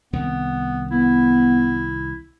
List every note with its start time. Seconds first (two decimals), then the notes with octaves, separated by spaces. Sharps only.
0.13 C2 D#3 B3 C4
0.91 B3 E4